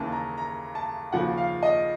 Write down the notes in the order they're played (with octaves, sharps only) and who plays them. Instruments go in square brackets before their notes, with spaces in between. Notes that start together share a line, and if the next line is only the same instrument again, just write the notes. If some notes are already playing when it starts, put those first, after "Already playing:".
Already playing: [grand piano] D#2 C#3 E3 A5
A#5
A#5
A5
D#2 C#3 F3 F#5
F5
D#5